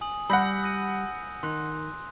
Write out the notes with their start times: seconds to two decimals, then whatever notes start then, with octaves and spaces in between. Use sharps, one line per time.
0.01 G#5 D#6 F#7
0.30 G3 F#5 B5 E6 G6 A#6
0.63 D#6 A#6 D#7
1.43 D#3 C6 F#6